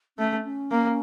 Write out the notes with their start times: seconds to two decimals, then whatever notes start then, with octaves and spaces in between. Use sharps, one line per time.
0.18 A3 C#4
0.45 C#4
0.71 A#3